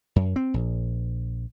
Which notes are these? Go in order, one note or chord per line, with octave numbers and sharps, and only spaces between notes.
F#2
C4
A#1